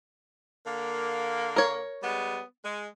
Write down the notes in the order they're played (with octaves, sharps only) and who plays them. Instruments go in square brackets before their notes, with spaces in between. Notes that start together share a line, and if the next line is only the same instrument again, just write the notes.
[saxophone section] D3 A#3
[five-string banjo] A#4 C#5
[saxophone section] G3 G#3 B3
G#3